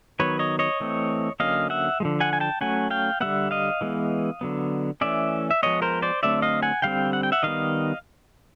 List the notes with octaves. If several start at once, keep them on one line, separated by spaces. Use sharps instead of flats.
D#3 F#3 B3 B4 C#5
C#5 D#5
C#5 D#5
E3 A3 C4
D3 F#3 A#3 C#4 D#5 F5
E5 F#5
D3 F3 G#3
F#5 G#5
G#5
G5 A5
F#3 A3 C#4 F#5 G#5
F5 G5
D3 G3 B3 E5 F#5
D#5 F5
E3 G#3 B3
D3 F#3 B3
E3 A3 C#4 D5 E5
E5
F3 G#3 B3 C#5 D#5
A#4 C5
C5 D5
D3 F#3 A3 C4 D5 E5
D#5 F5
F#5 G#5
D3 G3 C4 F5 G5
F#5
G5
E5 F#5
D#3 G3 B3 D#5 F5